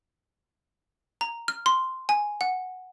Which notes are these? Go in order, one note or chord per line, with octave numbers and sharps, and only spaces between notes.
A#5
F6
C6
G#5
F#5